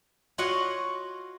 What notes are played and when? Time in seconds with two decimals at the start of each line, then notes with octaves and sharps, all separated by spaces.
0.38 F4 F#4 C#5 D#5 F5 F#5